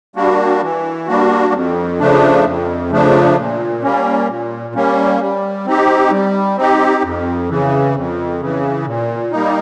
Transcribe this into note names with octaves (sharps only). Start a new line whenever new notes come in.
G3 A#3 D4 F#4
E3
G3 A#3 D4 F#4
F2
C#3 F3 A3 D4
F2
C#3 F3 A3 D4
A#2
G3 A#3 C#4
A#2
G3 A#3 C#4
G3
C4 D#4 G4
G3
C4 D#4 G4
F2
C#3 E3
F2
C#3 E3
A#2
G3 A#3 D#4